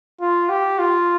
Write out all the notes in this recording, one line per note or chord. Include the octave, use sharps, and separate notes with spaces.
F4
G4
F4